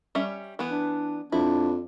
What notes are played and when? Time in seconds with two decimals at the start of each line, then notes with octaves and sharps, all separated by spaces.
0.15 G3 C#4 E5
0.59 E3 B3
0.71 D4
1.32 F2 D4 E4